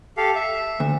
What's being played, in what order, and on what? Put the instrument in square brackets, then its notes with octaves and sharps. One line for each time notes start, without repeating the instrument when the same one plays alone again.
[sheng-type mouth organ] G4 A4 F5
E5
[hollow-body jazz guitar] D2